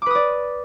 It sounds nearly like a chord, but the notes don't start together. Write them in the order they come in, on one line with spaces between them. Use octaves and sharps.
D6 B4 D#6 D5